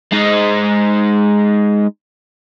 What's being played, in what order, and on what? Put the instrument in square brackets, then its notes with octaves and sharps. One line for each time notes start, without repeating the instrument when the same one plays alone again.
[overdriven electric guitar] G#3 D#4